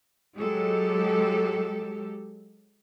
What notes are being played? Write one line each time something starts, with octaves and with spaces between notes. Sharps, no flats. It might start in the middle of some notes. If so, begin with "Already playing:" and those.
F#3 G#3 G4 A4